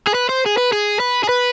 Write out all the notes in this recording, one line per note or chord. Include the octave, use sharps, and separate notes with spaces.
G#4
B4
C5
G#4
B4
G#4
B4
G#4
B4